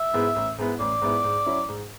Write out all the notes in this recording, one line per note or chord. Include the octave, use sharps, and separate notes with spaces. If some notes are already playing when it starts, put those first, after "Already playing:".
Already playing: E5
G#2 G#3 B3 E4
A1
G#2 G#3 B3 E4
A1 D5
G#2 G#3 B3 E4
G#2
F#3 C#4 E4
G#2